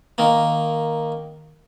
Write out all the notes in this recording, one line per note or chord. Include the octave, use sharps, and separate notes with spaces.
D#3 A#3